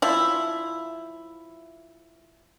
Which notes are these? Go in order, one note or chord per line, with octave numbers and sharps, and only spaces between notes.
F3 E4